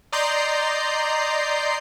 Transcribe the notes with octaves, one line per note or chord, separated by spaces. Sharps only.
D5 D#5 A#5 C6 G6 C7